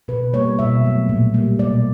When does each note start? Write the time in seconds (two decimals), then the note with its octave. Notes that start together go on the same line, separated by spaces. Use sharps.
0.08 B2 B4
0.33 G3 A#3 C#5
0.59 B2 E5
0.84 F#3 A3
1.09 A#2
1.34 G3 A#3
1.59 B2 D5